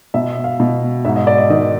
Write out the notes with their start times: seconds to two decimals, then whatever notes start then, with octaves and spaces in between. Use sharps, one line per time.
0.14 B2 E5
0.44 F5
0.60 B2
1.05 G#2 E5
1.16 D#5
1.27 D5
1.38 D#5
1.50 D#3 D#5